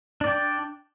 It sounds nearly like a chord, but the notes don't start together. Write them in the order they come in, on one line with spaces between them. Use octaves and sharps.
D4 D5 G5